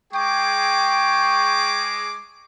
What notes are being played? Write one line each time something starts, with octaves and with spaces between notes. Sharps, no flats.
G#3 G#4 G5 C#6 D6